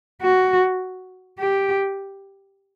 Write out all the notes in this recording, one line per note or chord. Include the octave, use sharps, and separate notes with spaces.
F#4
G4